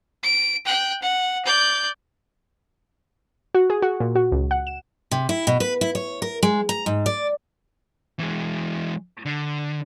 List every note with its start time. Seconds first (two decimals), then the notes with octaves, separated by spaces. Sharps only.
0.23 D7
0.65 G5 F#6
1.02 F#5
1.45 D5 G6
3.54 F#4
3.70 G#4
3.82 F#4
4.00 A#2
4.15 F#4
4.32 C#2
4.51 F#5
4.67 E7
5.11 C3
5.29 E4
5.47 B2
5.60 B4
5.81 E4
5.95 C#5
6.22 A#4
6.43 G#3
6.69 A#5
6.86 G#2
7.06 D5
8.19 E3 G#3
9.26 D3